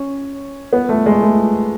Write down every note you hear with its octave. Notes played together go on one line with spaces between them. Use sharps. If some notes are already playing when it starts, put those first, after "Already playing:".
Already playing: C#4
B3
A3
G#3
A3